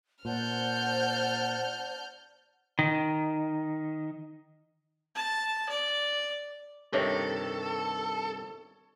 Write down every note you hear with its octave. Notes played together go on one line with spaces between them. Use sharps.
A#2 C5 D5 F#5 A5 F6 G6
D#3
A5
D5
G2 C3 D#3 A4 C#5